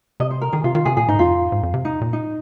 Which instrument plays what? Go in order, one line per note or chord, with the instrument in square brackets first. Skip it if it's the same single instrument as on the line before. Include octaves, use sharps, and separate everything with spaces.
[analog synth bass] C3 [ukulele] D#5
[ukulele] C5
A#4
[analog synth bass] D#3 [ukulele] G#4
[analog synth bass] C3 [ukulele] F4
[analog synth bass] D#3 [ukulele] F4
[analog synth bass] C3 [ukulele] G#4
[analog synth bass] A#2 [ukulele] G#4
[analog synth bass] G#2 [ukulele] D#4
[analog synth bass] F2 [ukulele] F4
[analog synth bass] G#2
F2
C3
[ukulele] D#4
[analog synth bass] A#2
[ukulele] D#4